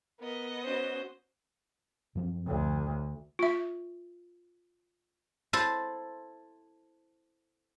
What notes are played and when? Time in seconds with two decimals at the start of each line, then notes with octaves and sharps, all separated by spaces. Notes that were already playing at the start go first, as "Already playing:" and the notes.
0.20 B3 A#4 D#5
0.64 C#4 F#4 C5
2.15 F#2 F3 C4
2.47 D2
3.39 F4 E5
5.53 E4 A4 C5